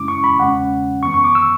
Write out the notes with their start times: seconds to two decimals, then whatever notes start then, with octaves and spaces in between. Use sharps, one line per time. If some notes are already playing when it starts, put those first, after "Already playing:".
Already playing: F#2 C#3 G#3 C#4 E4 D6
0.08 C#6
0.24 B5
0.39 E2 C#3 G#3 C#4 F#5
1.03 F#2 E3 B3 C#6
1.14 C#6
1.24 D6
1.35 E6